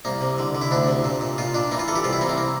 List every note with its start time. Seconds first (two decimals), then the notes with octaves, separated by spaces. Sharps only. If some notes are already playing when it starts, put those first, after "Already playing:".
0.05 C2 A#3
0.21 C3
0.38 D3
0.55 D3
0.62 E4
0.71 D2 D4
0.88 C3
1.04 A#2
1.21 A#2
1.38 A#2 F4
1.54 A#2 D4
1.71 E3 A#3
1.79 F4
1.88 E3 A4
1.96 G4
2.04 C2 F4
2.13 E4
2.21 C3 A#3
2.29 C4
2.37 A#3